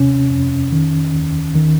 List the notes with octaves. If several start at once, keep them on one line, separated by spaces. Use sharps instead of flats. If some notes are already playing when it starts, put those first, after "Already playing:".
Already playing: D#2 C3 C#4
F2
D#3
D#2
D#3